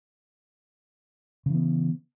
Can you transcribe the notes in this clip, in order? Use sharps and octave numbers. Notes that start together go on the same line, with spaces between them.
C#3 E3 B3